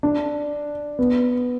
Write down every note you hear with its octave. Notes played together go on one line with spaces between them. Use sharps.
D4
B3